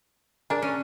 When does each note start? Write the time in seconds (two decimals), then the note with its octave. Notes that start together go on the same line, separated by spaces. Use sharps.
0.50 D4 G#4 A#4
0.62 C#4